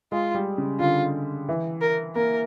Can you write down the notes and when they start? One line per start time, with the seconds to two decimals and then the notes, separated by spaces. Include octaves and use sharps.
0.12 G#3 F4
0.35 G3
0.58 C#3
0.80 D3 F4
1.49 E3
1.81 A#4
2.16 A#3 A#4